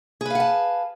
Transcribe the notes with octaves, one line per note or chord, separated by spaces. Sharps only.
G#4 B4 F5 F#5 A5